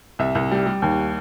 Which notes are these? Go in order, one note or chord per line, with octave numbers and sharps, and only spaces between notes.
C2 E5
C2
G3
G3
D#2